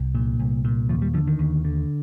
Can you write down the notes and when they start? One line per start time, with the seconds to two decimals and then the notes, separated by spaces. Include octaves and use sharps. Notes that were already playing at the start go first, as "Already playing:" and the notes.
Already playing: C2
0.15 A#2
0.39 C2
0.65 A#2
0.89 D#2 F3
1.02 G3
1.14 D3 F3
1.27 D#3
1.39 D#2
1.65 D3